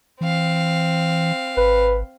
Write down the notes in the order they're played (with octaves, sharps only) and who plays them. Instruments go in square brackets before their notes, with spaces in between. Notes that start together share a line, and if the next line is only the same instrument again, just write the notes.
[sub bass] E3 [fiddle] C4 F5
[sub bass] G#1 [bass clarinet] B4